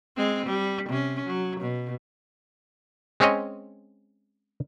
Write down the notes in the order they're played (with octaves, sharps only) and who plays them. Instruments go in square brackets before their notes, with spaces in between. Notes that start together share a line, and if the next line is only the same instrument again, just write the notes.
[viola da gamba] G#3 C4
G3
C3 C#4
F#3
B2
[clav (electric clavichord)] G#3 C4 C#4 G#4 C#5 D#5